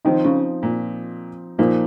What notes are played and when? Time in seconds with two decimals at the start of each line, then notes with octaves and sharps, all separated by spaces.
0.05 D#3 F3 C4 D#4
0.24 C#3
0.63 A#2
1.59 A#2 F3 A#3 D#4